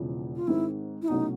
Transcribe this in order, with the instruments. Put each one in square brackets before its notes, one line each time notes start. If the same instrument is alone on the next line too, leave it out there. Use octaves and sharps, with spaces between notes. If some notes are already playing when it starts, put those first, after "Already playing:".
Already playing: [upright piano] E1 E2 C#3 F3
[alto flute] F4
[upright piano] G#2 D#3 G#3 C4 [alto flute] E4
[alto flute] E4
[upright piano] C2 B2 F#3 A3 C#4 [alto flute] D#4